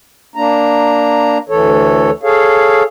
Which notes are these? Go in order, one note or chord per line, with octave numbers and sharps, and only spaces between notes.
A#3 D4 A#5
D2 E3 A4 C#5
G#4 A4 C#5 F5